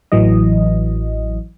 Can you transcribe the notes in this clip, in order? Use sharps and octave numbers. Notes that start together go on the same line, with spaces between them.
A1 E3 F#3 D#5